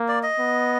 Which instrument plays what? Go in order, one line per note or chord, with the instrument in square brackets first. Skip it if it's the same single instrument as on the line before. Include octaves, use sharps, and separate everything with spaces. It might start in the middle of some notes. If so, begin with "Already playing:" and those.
Already playing: [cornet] A#3
[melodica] D5
D#5
[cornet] B3